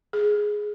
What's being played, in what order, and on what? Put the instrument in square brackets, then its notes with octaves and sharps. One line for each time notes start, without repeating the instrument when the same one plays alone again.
[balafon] G#4